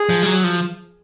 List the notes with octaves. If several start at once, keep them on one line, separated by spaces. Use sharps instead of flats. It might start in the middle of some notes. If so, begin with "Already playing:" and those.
Already playing: G#4
F3
G3
F#3
F3